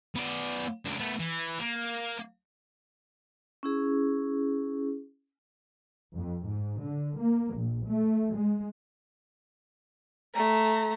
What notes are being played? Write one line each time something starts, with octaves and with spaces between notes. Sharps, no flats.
B3 D5
C#2 D4
A3 B3
E3
A#3
C#4 E4 G#4
F2
G#2
D3
A#3
A#1
A3
G#3
A3 A#5